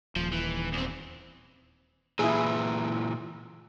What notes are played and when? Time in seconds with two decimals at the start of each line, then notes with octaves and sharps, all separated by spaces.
0.16 D#1 F3
0.32 E3
0.73 E2 C4
2.19 A#2 E3 E4 G#4